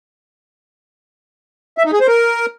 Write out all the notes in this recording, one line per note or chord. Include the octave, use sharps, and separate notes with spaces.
E5
D#4
G#4
C5
A#4